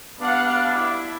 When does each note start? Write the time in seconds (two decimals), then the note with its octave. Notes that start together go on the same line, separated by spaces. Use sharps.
0.20 G2 B3 D4 F5 F#5
0.73 E4